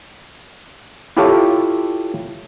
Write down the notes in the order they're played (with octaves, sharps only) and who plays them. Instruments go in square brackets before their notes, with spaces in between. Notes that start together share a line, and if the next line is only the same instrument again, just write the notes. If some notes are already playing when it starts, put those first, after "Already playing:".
[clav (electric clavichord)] E4 F4 G4 A4 C#5 F5